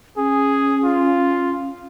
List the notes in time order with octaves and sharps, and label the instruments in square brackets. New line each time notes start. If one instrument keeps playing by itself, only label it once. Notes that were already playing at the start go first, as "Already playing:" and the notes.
[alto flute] C#4 [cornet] G#4
[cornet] F4